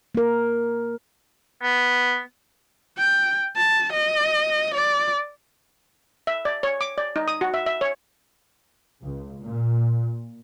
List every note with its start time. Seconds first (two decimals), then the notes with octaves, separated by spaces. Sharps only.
0.15 A#3 A#4
1.62 B3
2.98 G5
3.57 A5
3.92 D#5
4.74 D5
6.27 E5
6.45 D5
6.63 C#5
6.81 D6
6.98 D5
7.16 D#4
7.28 D#6
7.41 F#4
7.54 E5
7.66 E5
7.81 C#5
9.02 C#2
9.40 A#2